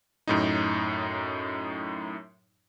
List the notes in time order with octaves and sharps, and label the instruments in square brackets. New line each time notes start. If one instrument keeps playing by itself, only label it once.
[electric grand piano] F#2 A2 D#4